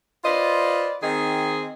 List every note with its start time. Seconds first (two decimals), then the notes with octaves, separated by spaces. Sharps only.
0.24 F4 B4 C5 D5 D#5
1.02 D#3 C4 G#4 D#5